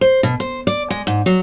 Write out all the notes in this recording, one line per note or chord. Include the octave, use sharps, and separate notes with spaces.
C5
B2
C5
D5
G#3
G#2
F#3